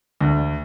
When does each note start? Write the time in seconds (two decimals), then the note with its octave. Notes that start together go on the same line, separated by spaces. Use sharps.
0.21 D2